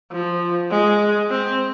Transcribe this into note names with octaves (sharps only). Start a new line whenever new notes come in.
F3
G#3
C4